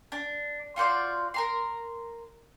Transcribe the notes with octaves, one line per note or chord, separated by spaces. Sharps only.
D4
F4 F#4 C5 D5
A#4 A#5 C6